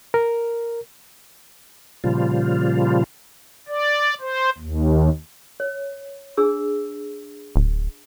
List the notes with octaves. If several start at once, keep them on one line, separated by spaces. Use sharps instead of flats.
A#4
A#2 C#3 F3 G3 F4
D5
C5
D#2
C#5
D4 G#4 E6
D1